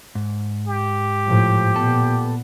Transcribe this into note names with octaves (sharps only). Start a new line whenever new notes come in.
G#2
G4
A2 F3
A#2 B3 A4